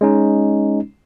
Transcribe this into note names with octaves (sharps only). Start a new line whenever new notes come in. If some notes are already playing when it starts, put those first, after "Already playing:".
G#3 C#4 D#4